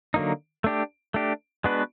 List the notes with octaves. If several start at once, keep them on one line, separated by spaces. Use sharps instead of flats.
D3 F#3 A#3 D#4
A3 D4 G4
A3 D4 G4
G#3 B3 D4 F#4 B4